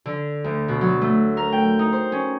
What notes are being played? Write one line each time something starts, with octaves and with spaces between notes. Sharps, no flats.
D3
D2
B2
F#3
A3
A#4
G5
D#4
C5
C#4